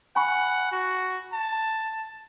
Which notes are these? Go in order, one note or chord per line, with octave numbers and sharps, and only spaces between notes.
F#5 G#5 B5 C#6
F#4
A5